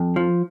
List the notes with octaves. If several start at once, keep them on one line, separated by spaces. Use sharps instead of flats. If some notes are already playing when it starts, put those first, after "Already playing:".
Already playing: F2
F3